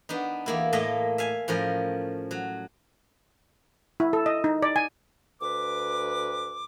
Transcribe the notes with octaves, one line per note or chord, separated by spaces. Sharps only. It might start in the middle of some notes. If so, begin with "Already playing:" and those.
B3 D4 D#4
E2 A#3 E4
A2 A3 A#3 A4 D#5 A#5
E5 F5 G#5
A2 F3 C#4 A#4
F#3
E4
A4
D#5
D#4
D5
G#5
D2 B4 D6